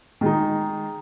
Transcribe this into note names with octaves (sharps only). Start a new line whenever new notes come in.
D#3 G#3 D#4